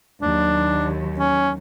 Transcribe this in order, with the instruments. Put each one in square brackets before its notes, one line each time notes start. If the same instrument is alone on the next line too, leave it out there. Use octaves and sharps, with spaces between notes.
[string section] D#2 F#3 [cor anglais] D4
[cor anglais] C#4